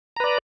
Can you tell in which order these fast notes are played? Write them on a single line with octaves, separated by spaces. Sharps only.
A#5 B4 D5